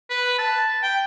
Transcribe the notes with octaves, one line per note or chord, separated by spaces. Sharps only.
B4
A5
G5